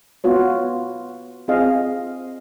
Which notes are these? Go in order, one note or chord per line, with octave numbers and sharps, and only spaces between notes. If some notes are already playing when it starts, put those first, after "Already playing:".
B3 F4 F#4 C#5
C4 F4 G#4 D#5 F5